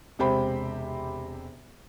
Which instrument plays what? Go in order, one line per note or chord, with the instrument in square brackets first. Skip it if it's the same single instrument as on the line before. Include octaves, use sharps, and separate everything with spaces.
[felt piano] E1 C3 G4 C5 G5 B5